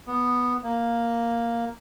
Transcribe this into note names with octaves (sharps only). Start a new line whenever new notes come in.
B3
A#3